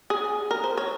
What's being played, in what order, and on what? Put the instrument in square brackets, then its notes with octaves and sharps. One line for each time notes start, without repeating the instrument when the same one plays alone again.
[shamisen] G#4
A#4
C5
C#5